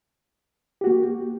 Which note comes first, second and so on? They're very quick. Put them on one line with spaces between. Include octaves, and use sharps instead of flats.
G4 F#4 A#3